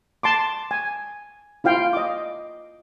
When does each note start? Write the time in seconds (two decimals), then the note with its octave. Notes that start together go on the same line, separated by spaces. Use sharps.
0.23 A5 C6 D6
0.71 G#5
1.64 E4 F4 F5 G5
1.93 D#5 D6